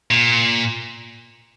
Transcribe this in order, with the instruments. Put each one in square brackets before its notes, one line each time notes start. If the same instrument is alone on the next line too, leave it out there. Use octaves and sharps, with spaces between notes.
[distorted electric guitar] A#2